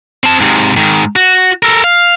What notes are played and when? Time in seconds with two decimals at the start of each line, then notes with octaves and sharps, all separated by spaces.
0.24 C4 A5
0.40 G#2 C3
0.77 G#2 D#3
1.16 F#4
1.63 A4 A#4
1.84 F5